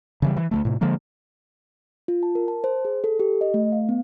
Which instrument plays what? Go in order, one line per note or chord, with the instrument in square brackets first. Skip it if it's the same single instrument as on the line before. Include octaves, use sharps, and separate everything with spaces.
[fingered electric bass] C#3 E3 G3
E3
D2 F3 A3
A2 C3
D3 F3 G#3 A#3
[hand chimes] F4
A5
A#4
A5
C5
G#4
A4
G4
D#5
A3
F5
B3